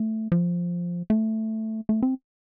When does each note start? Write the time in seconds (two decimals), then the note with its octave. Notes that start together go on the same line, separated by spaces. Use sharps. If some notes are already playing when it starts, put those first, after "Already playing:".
Already playing: A3
0.32 F3
1.10 A3
1.89 A3
2.03 C4